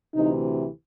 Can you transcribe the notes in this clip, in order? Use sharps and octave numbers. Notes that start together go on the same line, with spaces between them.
D2 C3 E3 D#4